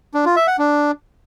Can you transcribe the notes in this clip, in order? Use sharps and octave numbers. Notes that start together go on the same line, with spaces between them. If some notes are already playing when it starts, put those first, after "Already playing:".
D4
F4
E5
F#5
D4